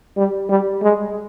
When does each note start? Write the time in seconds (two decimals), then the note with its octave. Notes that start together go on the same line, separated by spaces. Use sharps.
0.17 G3
0.49 G3
0.82 G#3